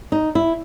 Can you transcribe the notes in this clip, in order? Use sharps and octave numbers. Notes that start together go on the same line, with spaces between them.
D#4
E4